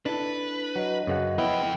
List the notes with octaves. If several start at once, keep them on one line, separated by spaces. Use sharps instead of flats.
D4 E4 A4 B4
F#3 D#5
F#2 C#3 F#5
F2 B3 E4 G5